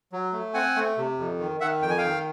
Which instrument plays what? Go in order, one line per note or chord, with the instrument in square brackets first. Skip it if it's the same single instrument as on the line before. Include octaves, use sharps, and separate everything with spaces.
[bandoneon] F#3
A3
C4 F#5 G#5
A3
C3
F2
D#3
D#3 E5 F#5
F2 G5
G#5
F5 G5
D#3